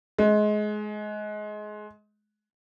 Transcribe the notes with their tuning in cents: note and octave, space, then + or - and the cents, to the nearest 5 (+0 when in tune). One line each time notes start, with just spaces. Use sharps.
G#3 +25